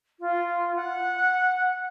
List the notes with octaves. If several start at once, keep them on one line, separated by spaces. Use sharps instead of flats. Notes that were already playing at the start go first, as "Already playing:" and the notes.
F4
F#5